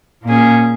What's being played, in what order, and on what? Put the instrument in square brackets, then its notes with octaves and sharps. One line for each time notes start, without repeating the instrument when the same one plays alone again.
[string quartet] A#2 A#3 C#4 G#4